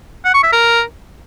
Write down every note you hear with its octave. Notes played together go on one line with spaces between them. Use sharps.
F#5
C#6
E5
A#4